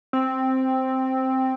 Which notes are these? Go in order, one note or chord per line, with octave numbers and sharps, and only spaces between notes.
C4